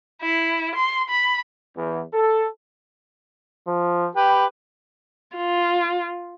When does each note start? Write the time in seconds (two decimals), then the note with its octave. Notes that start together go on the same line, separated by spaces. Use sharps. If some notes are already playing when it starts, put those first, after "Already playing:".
0.22 E4
0.75 C6
1.10 B5
1.77 E2
2.13 A4
3.67 F3
4.16 G4 B4 G5
5.36 F4